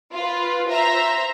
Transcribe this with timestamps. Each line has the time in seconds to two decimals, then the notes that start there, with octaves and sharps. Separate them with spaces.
0.14 F4 B4
0.69 C5 E5 A#5